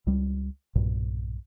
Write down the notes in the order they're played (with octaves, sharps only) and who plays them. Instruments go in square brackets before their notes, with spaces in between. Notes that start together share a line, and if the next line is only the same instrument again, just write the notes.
[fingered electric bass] C#2 G3
B1 G2 A#2